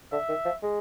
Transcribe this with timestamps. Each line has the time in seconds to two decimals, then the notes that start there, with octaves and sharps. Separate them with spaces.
0.12 D3 E5
0.29 D#3
0.45 F3
0.63 G#3